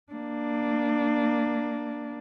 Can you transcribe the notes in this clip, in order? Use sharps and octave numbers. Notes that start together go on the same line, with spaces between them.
A#3 D4